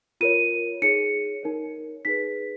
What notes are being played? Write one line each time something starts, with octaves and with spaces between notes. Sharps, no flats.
F4 A#4 C#5 D#7
D#4 G#4 C#5 C#7
D#4 A#4 C#5
D#4 G#4 B4 B6